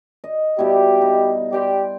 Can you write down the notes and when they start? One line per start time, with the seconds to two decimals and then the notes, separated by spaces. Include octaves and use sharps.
0.24 D#5
0.59 B2 G3 E4 G4
1.02 D#4
1.52 G4 D5 G5 C6